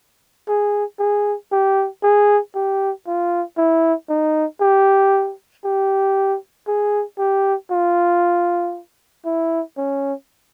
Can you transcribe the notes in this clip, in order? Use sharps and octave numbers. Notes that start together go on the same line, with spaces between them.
G#4
G#4
G4
G#4
G4
F4
E4
D#4
G4
G4
G#4
G4
F4
E4
C#4